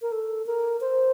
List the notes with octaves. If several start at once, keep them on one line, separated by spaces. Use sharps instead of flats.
A#4
A4
A#4
C5